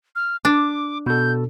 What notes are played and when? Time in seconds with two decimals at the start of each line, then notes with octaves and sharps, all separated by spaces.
0.16 F6
0.45 D4 D6
1.06 B2 A4 G6